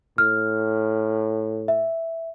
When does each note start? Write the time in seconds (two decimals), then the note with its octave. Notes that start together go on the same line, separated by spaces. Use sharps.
0.18 A2 F6
1.68 E5